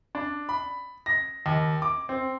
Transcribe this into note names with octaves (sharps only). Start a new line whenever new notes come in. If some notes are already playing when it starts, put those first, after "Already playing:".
D4
B5
A#6
D#2
D6
C4